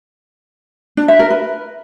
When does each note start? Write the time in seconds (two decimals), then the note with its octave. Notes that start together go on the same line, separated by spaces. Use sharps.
0.97 D4
1.08 E5
1.19 A#4
1.30 B4